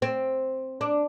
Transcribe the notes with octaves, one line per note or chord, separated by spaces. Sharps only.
C4
D4